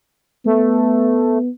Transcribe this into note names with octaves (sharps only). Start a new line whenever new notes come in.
A3 B3